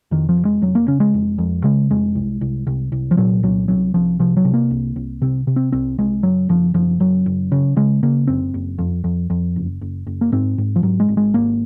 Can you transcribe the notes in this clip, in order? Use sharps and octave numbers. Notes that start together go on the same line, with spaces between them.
F2 D#3
F3
F1
G#3
F1 F#3
A#3
C#3 C#4
G#3
F1
F2
C#3 G#3
F1 G#3
C2
C2
C2
C2
F3
A#2 F#3
C2 F#3
C2 F#3
C2 F3
C3 F3
F#3
C3
A#3
C2
C2
C3 C4
C3
C4
C2 C4
C2 G#3
F#1 F#3
F#1 F3
F#1 F3
F#1 F#3
F#1
C#3
C#3 G#3
C#3 A#3
F#1 C4
F#1
F2
F2
F2
F#1
F#1
F#1
A#3
G#2 C4
G#2
F3
G#2 F#3
G#3
G#1
G#3
G#1 A#3